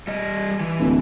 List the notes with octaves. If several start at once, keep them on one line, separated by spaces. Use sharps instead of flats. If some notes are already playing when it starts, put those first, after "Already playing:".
G3 D#5
E3
D1